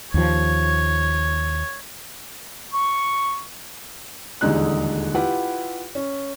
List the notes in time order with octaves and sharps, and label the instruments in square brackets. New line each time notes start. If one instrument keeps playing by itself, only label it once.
[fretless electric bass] D#2 F3 [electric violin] C#5
[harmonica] C#6
[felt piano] D#1 E2 D3 G#3 D#4 F#6
E4 F4 G4 B4 F#5
C#4